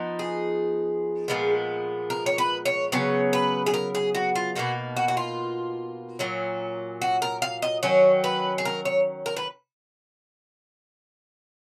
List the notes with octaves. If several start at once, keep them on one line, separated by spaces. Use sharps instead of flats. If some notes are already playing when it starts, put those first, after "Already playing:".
Already playing: F3 B3 D#4
G#4
A#2 F3 G#3 B3
A#4
C#5
B4
C#5
C#3 F#3 B3 C#5
B4
G#4
A#4
G#4
F#4
F4
B2 A#3 D#4 F#4
F#4
F#4
F4
A#2 F#3 C#4
F#4
A#4
F5
D#5
D#3 F#3 C#4 C#5
B4
G#4
A#4
C#5
A#4
B4